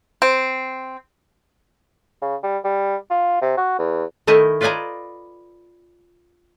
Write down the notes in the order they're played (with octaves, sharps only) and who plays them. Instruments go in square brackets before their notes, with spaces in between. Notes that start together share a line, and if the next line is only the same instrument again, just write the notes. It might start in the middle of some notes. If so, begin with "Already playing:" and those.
[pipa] C4
[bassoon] C#3
G3
G3
F4
C3
F#4
E2
[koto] D#3 A3 E4 D#5
F4 B4 D5 D#5 G#5 A#5